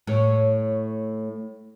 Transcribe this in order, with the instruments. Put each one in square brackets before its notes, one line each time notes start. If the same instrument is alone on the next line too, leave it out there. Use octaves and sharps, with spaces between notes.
[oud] A2 C#5